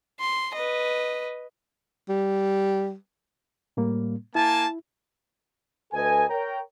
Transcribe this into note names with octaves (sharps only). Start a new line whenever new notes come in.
C6
B4 D#5
G3
A2 G3 A#3
A#3 E4 G#5 A5
D2 A4 B4 D#5 G#5
A#4 C#5 G5 A#5